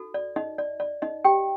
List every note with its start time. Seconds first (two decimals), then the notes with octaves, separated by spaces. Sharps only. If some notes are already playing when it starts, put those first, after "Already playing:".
Already playing: D#4 F#4 A4
0.14 D5
0.36 D#4 D#5
0.58 D5
0.80 D5
1.02 D#4 D#5
1.25 G4 G5